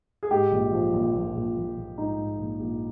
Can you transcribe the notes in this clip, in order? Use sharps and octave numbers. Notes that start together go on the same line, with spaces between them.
G#4
G#2 G4
A#1
F3
A#1
A#1
A#1
A#1
A#1
G#2 D#4
G#2
A#1
A#1